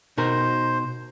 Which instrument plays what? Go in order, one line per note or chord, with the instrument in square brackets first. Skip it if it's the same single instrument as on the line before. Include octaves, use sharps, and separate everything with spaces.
[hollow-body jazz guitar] B2 D#4 A#4 [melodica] C5